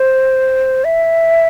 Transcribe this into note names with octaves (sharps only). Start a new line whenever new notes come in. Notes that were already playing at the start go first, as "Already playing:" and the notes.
Already playing: C5
E5